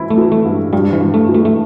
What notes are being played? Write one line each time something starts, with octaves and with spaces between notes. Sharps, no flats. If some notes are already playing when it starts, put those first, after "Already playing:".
Already playing: E3 E4
A3
E3
A3
G2
G2 G3
E3
G2
A3
E3
A3
A3